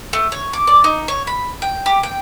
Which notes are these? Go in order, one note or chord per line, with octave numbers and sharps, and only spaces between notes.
A3
C#5
D6
D5
D#4
C#5
B5
G5
G4
G5